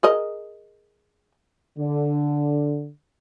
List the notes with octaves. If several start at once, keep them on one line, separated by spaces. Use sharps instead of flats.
G#4 A#4 D#5
D3